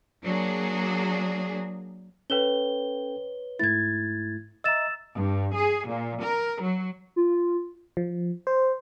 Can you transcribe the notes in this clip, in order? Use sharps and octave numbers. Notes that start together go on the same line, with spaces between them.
F#3 A#3 D4 G#4
C#4 A4 B4 C#5 G5 G7
G#2 A3 E4 G#6 A6
D#5 E5 A#5 E6 A6 E7
G2
G#4
A#2
A#4
F#3
F4
F3
C5